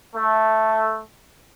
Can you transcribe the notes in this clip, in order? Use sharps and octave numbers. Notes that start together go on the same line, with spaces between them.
A3